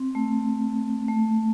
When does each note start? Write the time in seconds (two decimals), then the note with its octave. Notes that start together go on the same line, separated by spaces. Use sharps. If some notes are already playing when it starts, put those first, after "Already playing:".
Already playing: C4
0.15 A3
1.08 A3